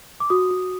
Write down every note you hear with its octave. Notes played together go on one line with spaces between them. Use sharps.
D6
F#4 D#6
F#4